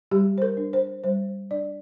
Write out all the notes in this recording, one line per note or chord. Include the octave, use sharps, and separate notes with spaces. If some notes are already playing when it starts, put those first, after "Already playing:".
G3 G4
C5
A#4
D4
C5
G3 C5
D4 D5